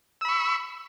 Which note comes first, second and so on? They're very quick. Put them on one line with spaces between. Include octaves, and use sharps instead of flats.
E6 B5 C#6